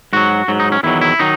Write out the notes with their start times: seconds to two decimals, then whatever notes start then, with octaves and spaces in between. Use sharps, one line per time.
0.13 G#2 F#3 F#4
0.48 G#2 F#3
0.60 D#4
0.72 C#4
0.83 E2 D#3 F#3 E4
1.01 E4
1.19 D#3 F#3 D#4